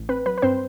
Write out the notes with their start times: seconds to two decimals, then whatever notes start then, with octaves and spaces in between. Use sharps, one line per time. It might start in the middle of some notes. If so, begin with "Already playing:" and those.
Already playing: A1
0.09 C4 B4
0.26 F#3 B4
0.38 B4
0.42 G2 C4 C5